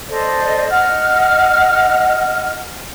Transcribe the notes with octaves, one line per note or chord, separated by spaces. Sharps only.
A4 C5 D5 D#5
D#5 F#5 F6